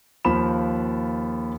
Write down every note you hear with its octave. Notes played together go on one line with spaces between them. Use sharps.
D#2 F3 B5 E7